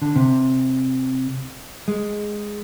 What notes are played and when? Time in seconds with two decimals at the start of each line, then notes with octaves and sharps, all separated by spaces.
0.02 D3
0.16 C3
1.88 G#3